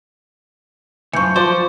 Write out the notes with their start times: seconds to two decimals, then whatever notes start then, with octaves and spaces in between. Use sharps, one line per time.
1.13 C#2 F#2 E3 F3 C#6 G6 C#7
1.36 F3 C5 D5